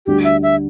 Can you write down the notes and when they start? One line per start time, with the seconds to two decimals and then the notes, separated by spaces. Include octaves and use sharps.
0.06 D2 D3 G3 G4
0.24 E5
0.43 E5